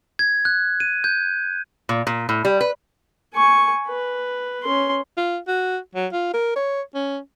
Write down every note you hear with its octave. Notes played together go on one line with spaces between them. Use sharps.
G#6
F#6
D#7
G6
A#2
A#2
A2
G3
B4
G#5 C#6
B4
C#4 C6
F4
F#4
F#3
F4
A#4
C#5
C#4